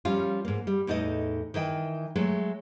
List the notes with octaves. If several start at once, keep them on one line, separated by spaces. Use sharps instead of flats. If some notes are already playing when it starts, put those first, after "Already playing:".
F3 G3 C#4 F4
G#2 A#3
G3
E2 A2 D#4 A4 D#5
D#3 E3 D#5 G5
F#3 G#3 A3